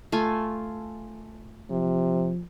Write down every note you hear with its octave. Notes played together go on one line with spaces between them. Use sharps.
A3 F4 G#5
C3 F3